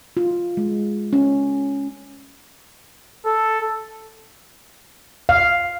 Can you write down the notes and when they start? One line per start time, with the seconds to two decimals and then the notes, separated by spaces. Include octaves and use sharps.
0.17 F4
0.57 G#3
1.13 C#4
3.25 A4
5.29 F5